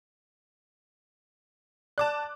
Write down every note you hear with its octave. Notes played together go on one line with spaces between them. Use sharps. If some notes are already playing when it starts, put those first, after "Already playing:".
D5 A5 D6 F#6